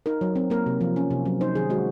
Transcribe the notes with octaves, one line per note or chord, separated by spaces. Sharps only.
D#4 A#4
F#3
C4
A#3 A#4
C3
F3
C#4
C3
F#3
D#4 C5
D#3 G#4
G#3 F#4